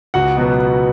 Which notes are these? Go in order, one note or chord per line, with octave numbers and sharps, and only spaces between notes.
C#2 F#4 F#5
B2 F#3 B3